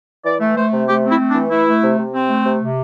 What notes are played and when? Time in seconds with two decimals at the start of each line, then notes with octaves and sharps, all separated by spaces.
0.24 E3 D5
0.40 A3
0.56 A3 C5
0.72 C3
0.88 A3 G4
1.04 C4
1.09 E4
1.19 A3
1.30 D4
1.35 E3
1.51 A3 E4
1.67 A3
1.83 C3
1.98 C3
2.14 C4
2.29 A3
2.46 C3
2.62 C3